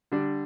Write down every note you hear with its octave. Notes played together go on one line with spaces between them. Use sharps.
D3 G3 D4